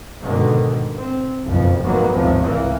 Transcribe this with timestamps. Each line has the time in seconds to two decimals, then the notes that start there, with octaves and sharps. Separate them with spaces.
0.22 G#2 B2 D3 D#3
0.97 C4
1.45 F#1 B1 F2 A#2 F3
1.82 F1 G#2 D#3 F#3 A#3 B3
2.13 G#1 D#2 A2 C3 F3
2.42 C#2 E3 A#3